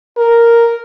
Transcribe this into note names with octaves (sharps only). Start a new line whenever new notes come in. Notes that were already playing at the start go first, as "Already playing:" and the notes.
A#4